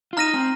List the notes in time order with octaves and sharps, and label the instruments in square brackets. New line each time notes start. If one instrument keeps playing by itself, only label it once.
[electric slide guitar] F4
[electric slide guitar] D#4 [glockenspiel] A#5 F6 A#6 D#7
[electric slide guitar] C4